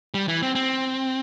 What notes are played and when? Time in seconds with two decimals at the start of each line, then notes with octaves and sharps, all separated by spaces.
0.14 G3
0.28 E3
0.42 C4
0.55 C4